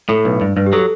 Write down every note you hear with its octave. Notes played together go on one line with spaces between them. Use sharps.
A2 A4
B1 B4
G2
G2 B4
G4
F#3 A4